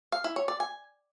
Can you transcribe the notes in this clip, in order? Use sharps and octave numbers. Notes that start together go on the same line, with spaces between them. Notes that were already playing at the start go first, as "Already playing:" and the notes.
F5
E4
C#5
D5
G#5